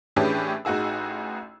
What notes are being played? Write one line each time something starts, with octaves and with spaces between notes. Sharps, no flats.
A2 E3 C#4 D4 G4 G#4
A1 D#4 F#4 G#4 E6